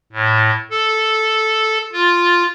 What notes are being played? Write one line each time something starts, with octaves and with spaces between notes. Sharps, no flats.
A2
A4
F4